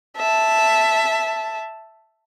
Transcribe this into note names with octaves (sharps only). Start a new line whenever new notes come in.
E5 A5